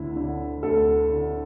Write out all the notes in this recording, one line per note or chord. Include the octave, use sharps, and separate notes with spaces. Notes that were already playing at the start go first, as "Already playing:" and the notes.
Already playing: D2 D3 E4
D3
D2 A4
D3